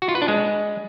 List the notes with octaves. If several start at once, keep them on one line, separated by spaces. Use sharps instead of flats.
F#4
F4
B4
D4
G#3